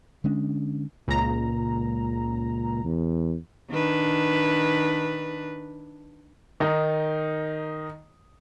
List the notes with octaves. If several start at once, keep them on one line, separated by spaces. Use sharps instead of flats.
D3 G#3 C#4 D4
C#2 A#2 A#5
E2
D#3 D4 B4
D#3 D#4